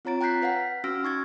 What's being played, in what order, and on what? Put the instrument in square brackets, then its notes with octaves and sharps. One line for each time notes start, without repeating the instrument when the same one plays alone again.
[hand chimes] C4 F4 C#5 A#5 A6 D7
G5 A#5 F#6 G6 B6 C7
B4 F5 F#5 B6
C#4 F#4 E6 F6 A#6 D7
D#4 C#6 G#6 A6